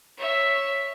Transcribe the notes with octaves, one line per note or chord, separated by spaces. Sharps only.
C#5 E5